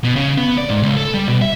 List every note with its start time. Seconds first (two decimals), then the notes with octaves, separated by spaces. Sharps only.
0.04 B2
0.16 C#3
0.38 B3
0.58 D5
0.69 G#2
0.83 C#2
0.97 A4
1.14 G3
1.28 B2
1.42 E5